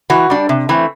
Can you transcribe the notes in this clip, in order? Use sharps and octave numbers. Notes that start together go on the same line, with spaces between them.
E3 F#4
G3 D4
C3
E3 A3 C4